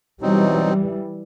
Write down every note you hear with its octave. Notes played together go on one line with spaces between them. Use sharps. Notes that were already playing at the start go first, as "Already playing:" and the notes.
B2 E3 F#3 G3 C4 D#4